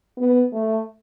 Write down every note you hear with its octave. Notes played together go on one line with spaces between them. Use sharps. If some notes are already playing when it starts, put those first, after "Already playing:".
B3
A3